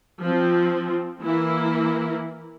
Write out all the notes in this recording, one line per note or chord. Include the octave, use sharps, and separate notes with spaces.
F3 C4
E3 A#3 E4